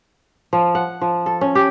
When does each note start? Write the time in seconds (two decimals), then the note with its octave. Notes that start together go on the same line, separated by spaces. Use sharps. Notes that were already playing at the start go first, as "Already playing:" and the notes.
0.53 F3
0.75 F#5
1.01 F3
1.26 A4
1.41 C#4
1.55 G4